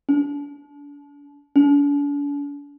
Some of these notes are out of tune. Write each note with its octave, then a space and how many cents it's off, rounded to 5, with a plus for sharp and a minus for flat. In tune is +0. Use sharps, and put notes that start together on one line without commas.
D4 -35
D4 -45